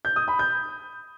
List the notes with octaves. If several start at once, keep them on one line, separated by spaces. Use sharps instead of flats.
G6
D#6
B5
G6